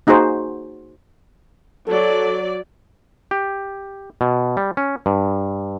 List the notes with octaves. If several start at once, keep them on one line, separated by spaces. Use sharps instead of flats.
A#3 D#4 F#4 G#4 C5
F#3 A4 D5
G4
B2
G3
C#4
G2